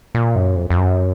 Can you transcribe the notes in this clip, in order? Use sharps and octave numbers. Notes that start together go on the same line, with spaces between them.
A#2
F#2
F2
F2
F#2